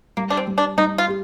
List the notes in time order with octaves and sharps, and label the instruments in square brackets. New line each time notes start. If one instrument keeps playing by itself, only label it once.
[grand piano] G3 [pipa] A#3
[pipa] D4
C4
[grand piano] G3
[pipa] D4
[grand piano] G3 [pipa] D#4
[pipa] F4
[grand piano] G4